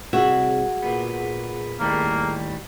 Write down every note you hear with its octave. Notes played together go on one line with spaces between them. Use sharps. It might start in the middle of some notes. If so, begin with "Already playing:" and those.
C2 F#4 G#4 E5
A#2 B3
D#2 A2 G3 A#3